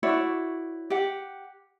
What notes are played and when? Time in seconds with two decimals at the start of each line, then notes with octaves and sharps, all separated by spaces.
0.03 E4 F#4 C#5 D5
0.90 G4 F#5